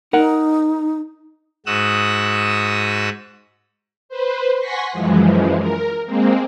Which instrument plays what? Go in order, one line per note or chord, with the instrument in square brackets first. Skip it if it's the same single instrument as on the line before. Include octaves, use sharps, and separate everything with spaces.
[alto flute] D#4 [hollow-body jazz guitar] A#4 F#5
[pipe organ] G#2 F#4 D#6 E6 F#6
[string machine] B4 C5
F#5 G#5 C6 C#6 A#6 B6
F#2 E3 F3 G#3
A#4
G#3 A#3 C4